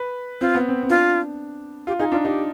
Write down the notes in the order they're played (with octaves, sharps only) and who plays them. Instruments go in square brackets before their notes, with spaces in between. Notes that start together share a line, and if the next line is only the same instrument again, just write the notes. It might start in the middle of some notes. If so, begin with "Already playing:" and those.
Already playing: [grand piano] B4
[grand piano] C4 [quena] F4
[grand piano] B3
C4
C4
[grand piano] D4 [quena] F4
[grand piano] F4 [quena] G4
[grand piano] D#4 [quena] G#4
[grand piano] D4 [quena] F4
[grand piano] D#4 [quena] G4